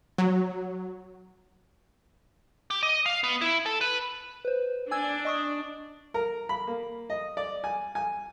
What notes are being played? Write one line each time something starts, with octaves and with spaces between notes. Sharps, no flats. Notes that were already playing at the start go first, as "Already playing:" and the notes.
F#3
G4
D#5
F5
B3
E4
A4
B4
B4 C5
D4 G#5 E6 G#6
D#5 C#6 D#6
A#4
B5
A#3
D#5
D5
G#5
G#5